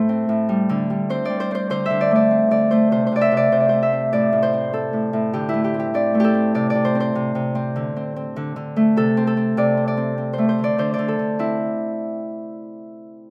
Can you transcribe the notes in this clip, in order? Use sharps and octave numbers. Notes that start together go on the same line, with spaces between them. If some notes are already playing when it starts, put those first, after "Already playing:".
Already playing: A2 A3 A4 C5
C4
A2
G3
D3
G3
C4 C5
G3 D5
C5
C4 C5
D3 C5
D3 E5
D5
A3 D5
C4
D3 D5
A3 C5
C3 C5
C5
C3 D5
E5
C3
D5
C3 C5
D5
A3 C5
E5
C4
A2 D5
A2
C5
C4
C4 A4
A2
A2
D3 G4
E4
A3
G4
C4
G4
C4 D5
A3
G4 A4
C4
C3 D5
D5
C3
C5
C4
C5
C3
C3
C4
D3
C4
C4
D3
D3
A3
C3 A4
C4
A4
C4
C3 D5
C4
D5
C4
C4
A3 C5
C5
D3
D5
D3 C5
D5
D3
A4
D3
C4 E4